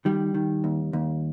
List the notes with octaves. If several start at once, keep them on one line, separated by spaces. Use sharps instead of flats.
D#3 G3
D#3
D#2
D#2